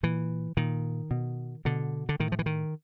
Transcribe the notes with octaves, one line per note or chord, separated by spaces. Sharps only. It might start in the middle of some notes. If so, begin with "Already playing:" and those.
A#2 E3
A#2 D#3
B2
B2 D3
D3
A2 D#3
F3
E3
D#3